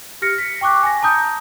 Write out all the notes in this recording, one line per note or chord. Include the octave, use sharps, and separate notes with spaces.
G4 F6 A#6 C#7
A#6 B6
G5 C#6 D6 F#6
G#5 A#6
A5 A#5 D#6 G6